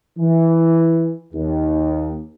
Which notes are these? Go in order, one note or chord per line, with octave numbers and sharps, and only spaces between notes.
E3
D#2